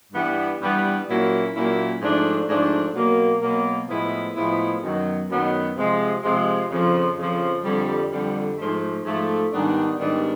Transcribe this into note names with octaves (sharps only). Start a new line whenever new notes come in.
G2 E3 G3 B3
G2 E3 G3 B3
A#2 F#3 A#3 C#4 E4
A#2 F#3 A#3 C#4 E4
G#2 F3 A3 D4
G#2 F3 A3 D4
B2 F#3 A#3
B2 F#3 A#3
A2 F3 G#3 B3 E4
A2 F3 G#3 B3 E4
F#2 D#3 F#3 B3
F#2 D#3 F#3 B3
C3 F3 G#3
C3 F3 G#3
F2 C#3 F3
F2 C#3 F3
F2 D3 G3
F2 D3 G3
G#2 F3 A3
G#2 F3 A3
G#2 D#3 G3 B3 D4
G#2 D#3 G3 B3 D4